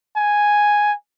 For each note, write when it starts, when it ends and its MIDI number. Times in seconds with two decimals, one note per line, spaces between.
0.16 0.94 80